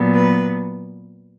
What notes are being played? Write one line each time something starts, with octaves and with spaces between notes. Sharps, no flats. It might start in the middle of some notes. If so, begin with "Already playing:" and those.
Already playing: A#2 F#3 B3
B4